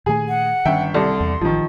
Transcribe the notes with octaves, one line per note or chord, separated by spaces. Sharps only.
A#2 D#3 A3 G#4 G#5
F#5
G1 D#3 C#4 E5 G5
C2 A4 D5 C6
E2
A1 D#3 F3